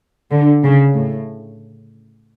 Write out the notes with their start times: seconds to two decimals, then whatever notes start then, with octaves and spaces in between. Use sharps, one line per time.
0.31 D3
0.63 C#3
0.94 A2